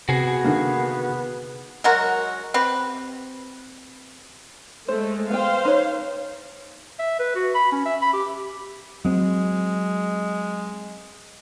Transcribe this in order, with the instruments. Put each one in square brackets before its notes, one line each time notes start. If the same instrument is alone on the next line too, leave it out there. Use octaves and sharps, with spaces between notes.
[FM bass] C3 [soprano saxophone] B3 [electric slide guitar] F#4 G#4
[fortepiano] D3 D#3 A#3
[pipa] F#3 G#3 F#4 A#4
C4 G4 B4
[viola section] G#3 A3 [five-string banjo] C5
[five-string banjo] B3 G5 [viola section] C5 F5
[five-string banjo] D#4 B4 C#5
[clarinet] E5
B4
F#4
B5
C#4
E5
B5
G4
[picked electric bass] F#3 C4 [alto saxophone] G#3